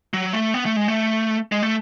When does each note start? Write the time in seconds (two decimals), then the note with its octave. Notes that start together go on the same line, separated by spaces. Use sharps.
0.14 F#3
0.33 A3
0.54 B3
0.66 A3
0.77 G#3
0.88 A3
1.52 G#3
1.63 A3